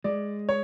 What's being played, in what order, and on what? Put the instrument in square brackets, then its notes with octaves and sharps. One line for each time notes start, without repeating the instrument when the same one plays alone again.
[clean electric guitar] G#3 [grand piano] D5
[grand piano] C#5